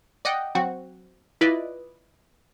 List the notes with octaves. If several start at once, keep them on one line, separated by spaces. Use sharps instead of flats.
D5 D#5 F#5 G5
F#3 C4 F#4
E4 F4 B4 D5 D#5